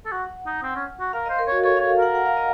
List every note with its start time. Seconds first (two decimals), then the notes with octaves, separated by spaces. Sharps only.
0.05 A4
0.12 F#4 F#5
0.46 D#4
0.62 C4
0.76 C#4
1.00 F#4
1.13 A#4 F5
1.26 D#5
1.30 C5
1.39 A#4
1.47 F#4 C#5
1.64 A4 C#5
1.77 F5
1.80 C#5
1.89 F5
1.98 A#4 F#5
2.15 F#5
2.26 F5
2.37 D#5